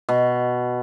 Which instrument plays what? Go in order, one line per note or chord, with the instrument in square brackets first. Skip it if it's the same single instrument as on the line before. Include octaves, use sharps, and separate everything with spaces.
[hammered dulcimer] B2